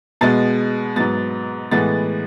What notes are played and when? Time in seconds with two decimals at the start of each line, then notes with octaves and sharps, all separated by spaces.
0.21 B2 G#3 B3 A6
0.96 G#2 F#3 B3 A6
1.71 A2 E3 G#3 B3 A6